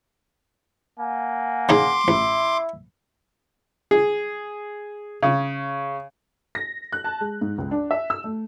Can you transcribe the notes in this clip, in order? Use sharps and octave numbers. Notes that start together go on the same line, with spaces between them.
A#3 F#5 G#5
C#3 D#4 G#4 C6 D6
A1 E4 E5
G#4
C#3
A#6
F#6
A5
G#3
G#2
C#2
D4
E5
E6
A3